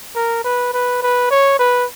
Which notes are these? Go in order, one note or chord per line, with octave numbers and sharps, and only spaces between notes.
A#4
B4
B4
B4
C#5
B4